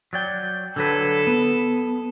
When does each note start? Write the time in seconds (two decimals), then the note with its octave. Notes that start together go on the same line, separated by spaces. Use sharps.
0.13 F#3 D5 G5
0.76 D3 F#3 A4 B4
1.27 B3